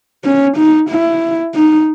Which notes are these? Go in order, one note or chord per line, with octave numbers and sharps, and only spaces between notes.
C#4
D#4
E4
D#4